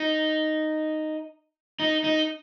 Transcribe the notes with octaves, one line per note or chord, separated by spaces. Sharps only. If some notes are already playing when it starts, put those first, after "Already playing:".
Already playing: D#4
D#4
D#4